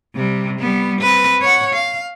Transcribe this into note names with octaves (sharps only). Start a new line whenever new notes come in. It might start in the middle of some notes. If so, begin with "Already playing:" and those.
C3 G3
G3 B3
C4 B4
C#5 F#5
F5